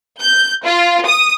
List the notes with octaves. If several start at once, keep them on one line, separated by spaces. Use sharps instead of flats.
G6
F4
D#6